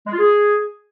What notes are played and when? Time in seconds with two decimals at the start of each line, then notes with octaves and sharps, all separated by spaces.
0.07 G#3
0.13 F4
0.19 G#4